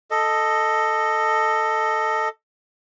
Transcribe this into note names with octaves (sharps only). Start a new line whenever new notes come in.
A4 D#5